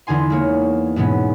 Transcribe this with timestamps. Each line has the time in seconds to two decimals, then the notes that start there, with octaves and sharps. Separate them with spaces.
0.07 E2 D3 D#4 G#5 C6
0.30 G#3 A#3 C#5
0.96 G#2 B2 E3 G#3 B3 C#4